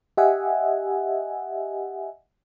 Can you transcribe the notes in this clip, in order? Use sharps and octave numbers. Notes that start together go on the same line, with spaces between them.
G4 D#5 E5 F#5 G#5